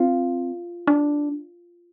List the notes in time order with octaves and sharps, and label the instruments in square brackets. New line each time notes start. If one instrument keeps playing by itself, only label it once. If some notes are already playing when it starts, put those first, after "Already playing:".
Already playing: [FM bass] C4 [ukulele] F4
[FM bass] D4